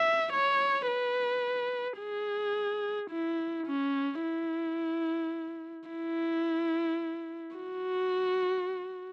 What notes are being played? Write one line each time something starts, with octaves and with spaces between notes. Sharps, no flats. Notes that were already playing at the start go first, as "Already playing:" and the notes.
Already playing: E5
C#5
B4
G#4
E4
C#4
E4
E4
F#4